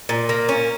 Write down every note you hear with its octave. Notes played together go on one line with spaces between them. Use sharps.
A#2
A#3
C#4